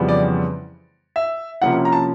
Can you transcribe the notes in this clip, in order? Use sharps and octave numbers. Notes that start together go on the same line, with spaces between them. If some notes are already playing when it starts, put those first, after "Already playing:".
Already playing: F2 C#3 E3 G3 B3
D5
E5
C3 F3 A#3 C#4 E4 F#5
A#5
A5